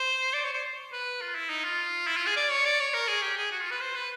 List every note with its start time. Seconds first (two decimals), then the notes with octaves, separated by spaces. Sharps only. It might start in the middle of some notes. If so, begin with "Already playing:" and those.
Already playing: C5
0.34 D5
0.44 C#5
0.53 C5
0.92 B4
1.21 F4
1.35 E4
1.49 D#4
1.64 F4
2.07 E4
2.17 F4
2.26 G#4
2.36 D5
2.51 C#5
2.65 D5
2.80 C#5
2.94 A#4
3.08 G#4
3.22 G4
3.37 G#4
3.52 F#4
3.61 F4
3.71 B4
3.80 C5
3.95 B4